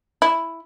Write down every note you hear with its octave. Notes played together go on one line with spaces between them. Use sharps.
E4